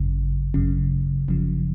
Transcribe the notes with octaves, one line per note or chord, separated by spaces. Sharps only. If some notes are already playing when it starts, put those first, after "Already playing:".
Already playing: G#1 F#2 C#3
G#1 F#2 C#3
G#1 F#2 C#3 F3